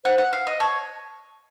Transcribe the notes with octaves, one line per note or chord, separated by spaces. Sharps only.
C5 F#5
F#5
F5
D#5
C#5 A5